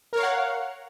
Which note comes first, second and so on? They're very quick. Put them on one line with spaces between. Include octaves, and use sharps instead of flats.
A#4 C#5 F5 F#5